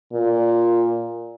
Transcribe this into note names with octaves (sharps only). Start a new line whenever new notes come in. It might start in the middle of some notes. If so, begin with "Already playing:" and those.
A#2